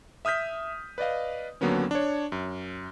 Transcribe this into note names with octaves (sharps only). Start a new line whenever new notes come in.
E5 D#6 F6 G6 B6
B4 D5 D#5 F5
D#2 D3 F#3 A#3 B3 C#4
D4 C#5
F#2